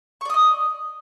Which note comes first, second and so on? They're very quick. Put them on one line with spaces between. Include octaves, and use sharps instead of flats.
C#6 D5 D#6 D#5